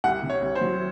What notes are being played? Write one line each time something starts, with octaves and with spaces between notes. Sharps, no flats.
C2 F#5
C3
C#5
C2
C5
F#3